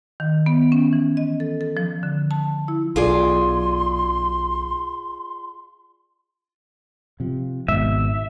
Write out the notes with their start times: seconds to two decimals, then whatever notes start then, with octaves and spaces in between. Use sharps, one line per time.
0.20 D#3
0.46 B3
0.72 C#4
0.93 E3
1.17 D#5
1.40 A4
1.61 A4
1.77 F3
2.03 D3
2.31 A5
2.68 E4
2.96 B1 F4 G#4 D5 C6
7.20 C3 F3
7.68 G#1 G#2 B2 E5